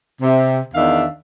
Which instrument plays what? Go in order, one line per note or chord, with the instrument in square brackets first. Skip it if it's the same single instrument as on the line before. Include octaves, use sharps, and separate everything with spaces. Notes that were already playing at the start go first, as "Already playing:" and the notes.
[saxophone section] C3
E2 D#3 D4 E5 F5